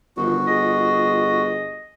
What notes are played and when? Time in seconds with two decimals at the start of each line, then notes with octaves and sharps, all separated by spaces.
0.17 G1 D3 D#3 F3 F#4
0.47 F4 G#4 D#5